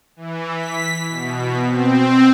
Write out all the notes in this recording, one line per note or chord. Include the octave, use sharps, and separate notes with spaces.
E3
B6
B2
C4